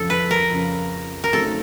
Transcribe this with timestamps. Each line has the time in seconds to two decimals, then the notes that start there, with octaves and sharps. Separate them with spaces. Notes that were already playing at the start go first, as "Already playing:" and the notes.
Already playing: F2 C#3 F3 A4
0.10 B4
0.31 A#4
0.51 F2 C#3 F3
1.24 A#4
1.33 C#3 F#3 A3 C4 D#4 A4